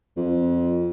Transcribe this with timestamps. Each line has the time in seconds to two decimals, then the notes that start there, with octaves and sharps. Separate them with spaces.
0.17 F2